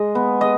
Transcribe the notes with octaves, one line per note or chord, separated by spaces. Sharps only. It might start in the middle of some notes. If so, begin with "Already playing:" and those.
Already playing: G#3 D#5
B3
D#5